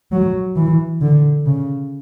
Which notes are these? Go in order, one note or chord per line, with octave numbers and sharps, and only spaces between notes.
F#3
E3
D3
C#3